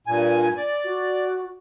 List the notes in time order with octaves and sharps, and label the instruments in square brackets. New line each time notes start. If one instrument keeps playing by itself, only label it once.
[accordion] G2 A#2 G#5
D5
[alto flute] F#4